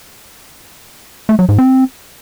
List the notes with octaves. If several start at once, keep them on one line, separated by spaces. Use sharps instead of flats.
A3
F#3
G#2
C4